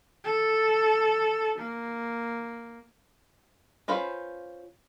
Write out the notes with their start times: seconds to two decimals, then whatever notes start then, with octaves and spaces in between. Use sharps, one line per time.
0.24 A4
1.58 A#3
3.88 C#4 F4 B4 C5